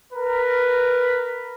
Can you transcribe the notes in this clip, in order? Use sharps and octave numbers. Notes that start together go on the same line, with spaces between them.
A#4 B4